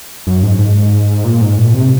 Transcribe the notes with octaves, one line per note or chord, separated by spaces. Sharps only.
F#2
G#2
G#2
A#2
G#2
A#2
C3